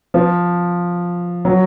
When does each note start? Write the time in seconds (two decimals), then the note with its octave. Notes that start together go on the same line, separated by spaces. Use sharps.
0.14 F3
1.45 F#3